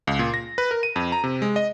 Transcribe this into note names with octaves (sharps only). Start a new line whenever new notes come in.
C#2
A#2
A#6
B4
A#4
D#7
F2
A#5
C3
G#3
D#5